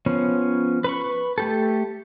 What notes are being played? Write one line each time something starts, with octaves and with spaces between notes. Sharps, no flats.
F3 B3 C#4
B4 B5 C#6
A3 G4 A4